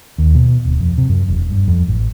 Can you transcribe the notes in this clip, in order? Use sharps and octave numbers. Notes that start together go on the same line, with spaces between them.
D#2
B2
D1
F2
C3
F#2
E1
G2
F2
A1